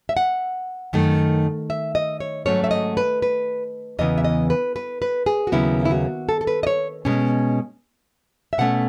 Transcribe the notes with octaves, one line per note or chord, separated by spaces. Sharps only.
E5
F#5
F#2 D#3 A3
E5
D#5
C#5
G#2 F#3 A3 C#4 C#5
E5
D#5
B4
B4
E2 C#3 E3 B3 D#5
E5
D#5
B4
B4
B4
G#4
F#4
D#2 C#3 F#3 B3 E4
E4
F#4
A4
A4
B4
D#5
C#5
B2 G#3 C#4
E5
B2 A3 C#4 F#5